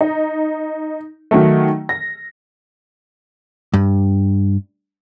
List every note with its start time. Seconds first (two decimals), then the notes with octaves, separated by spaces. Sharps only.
0.01 D#4
1.31 D#3 F#3 A3
1.89 A#6
3.74 G2